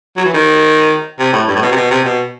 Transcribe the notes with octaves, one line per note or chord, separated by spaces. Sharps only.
F#3
E3
D#3
C3
A2
G2
A2
B2
C3
B2
C3
B2